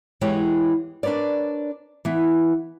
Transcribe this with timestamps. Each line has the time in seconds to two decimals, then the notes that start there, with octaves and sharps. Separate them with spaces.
0.21 E2 E3 G#3 G4 C#5
1.03 D4 A#4 B4 C#5 D5
2.05 E3 B3